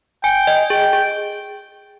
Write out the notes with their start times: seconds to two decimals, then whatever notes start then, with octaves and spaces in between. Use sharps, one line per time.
0.24 G5 G#5
0.47 D#5
0.70 G#4 G5
0.93 G#4